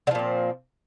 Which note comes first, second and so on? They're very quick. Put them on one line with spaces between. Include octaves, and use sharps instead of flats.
D3 F3 A#2 C4